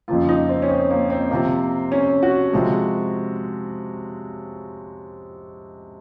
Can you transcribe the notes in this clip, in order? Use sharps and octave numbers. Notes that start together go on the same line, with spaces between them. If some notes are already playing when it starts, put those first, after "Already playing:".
F2 C#3 F3 A#3 F4
D#4
C4
C#4
C4
A#3
C4
C3 F3 A#3
C#4
F#4
C3 F3 G#3